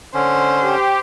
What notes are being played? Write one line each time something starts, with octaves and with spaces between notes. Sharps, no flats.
D3 C#4 C5
G4